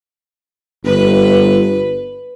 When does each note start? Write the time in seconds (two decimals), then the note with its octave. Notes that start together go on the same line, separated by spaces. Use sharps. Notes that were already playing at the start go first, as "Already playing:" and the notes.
0.85 G1 B4